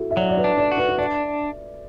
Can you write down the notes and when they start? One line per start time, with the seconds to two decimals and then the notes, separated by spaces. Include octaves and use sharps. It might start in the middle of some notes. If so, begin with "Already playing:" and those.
Already playing: E4 F#4 A4
0.11 E5
0.17 F#3 D5
0.29 D5
0.37 B4
0.44 D4
0.57 D5
0.72 F#4
0.77 B4
0.88 B4
0.98 D4 D5